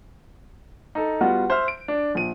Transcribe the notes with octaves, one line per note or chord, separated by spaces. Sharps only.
D#4 A4
G3 B3 F4 F#4
C5 E5 F6
D7
D4
A#1 D#7